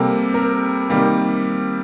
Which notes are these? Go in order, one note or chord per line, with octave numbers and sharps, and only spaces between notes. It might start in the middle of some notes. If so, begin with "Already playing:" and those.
Already playing: C3 G3 A#3 A4
A#4
C3 D#3 G3 A#3